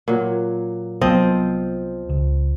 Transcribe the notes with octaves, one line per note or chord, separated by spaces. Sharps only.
A#2 F#3
C2 F3 F#3 B3 C4 D#5
C#2